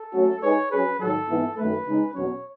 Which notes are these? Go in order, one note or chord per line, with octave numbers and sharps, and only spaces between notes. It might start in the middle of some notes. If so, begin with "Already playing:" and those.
Already playing: A4
F#3 A3 C#4 F#4
G#3 D#4 G#4 B4 C#5
F#3 C#4 G#4 B4
G#2 D#3 F#3 A4
G#2 E3 B3 E4
F#2 D#3 A3 B4
C#3 G#3 D#4
E2 B2 F#3 C#4 C#5